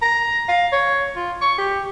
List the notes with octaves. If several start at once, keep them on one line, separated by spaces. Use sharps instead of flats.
A#5
F5
C#5
F4
C#6
G4